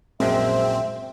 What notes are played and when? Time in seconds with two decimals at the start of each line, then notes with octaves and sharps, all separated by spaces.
0.20 A#1 F#2 G#3 C4 E5